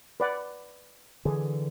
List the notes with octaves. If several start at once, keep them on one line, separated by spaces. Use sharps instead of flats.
B4 D5 F#5
D3 E3 G#4